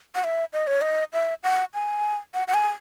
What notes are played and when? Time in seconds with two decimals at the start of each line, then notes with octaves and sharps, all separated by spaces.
0.15 F#5
0.24 E5
0.53 D#5
0.67 C#5
0.81 D#5
1.13 E5
1.44 F#5
1.74 G#5
2.34 F#5
2.48 F#5
2.54 G#5